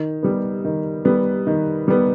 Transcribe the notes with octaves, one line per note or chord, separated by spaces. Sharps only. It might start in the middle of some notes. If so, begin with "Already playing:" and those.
Already playing: D#3
G3 B3
D#3
G3 B3
D#3
G3 B3